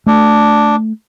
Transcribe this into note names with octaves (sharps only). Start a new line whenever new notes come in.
A3 D4